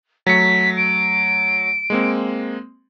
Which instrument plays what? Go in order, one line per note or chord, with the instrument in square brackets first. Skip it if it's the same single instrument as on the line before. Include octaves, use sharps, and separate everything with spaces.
[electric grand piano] F#3 A3 C#7 [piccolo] B6
[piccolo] D7
[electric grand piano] G#3 A#3 C4